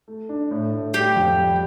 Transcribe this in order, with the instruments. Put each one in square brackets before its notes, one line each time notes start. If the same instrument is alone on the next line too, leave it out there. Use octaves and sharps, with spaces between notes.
[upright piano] A3
D4
A2
A2
[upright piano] G3 [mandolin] G4
[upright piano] F2
G3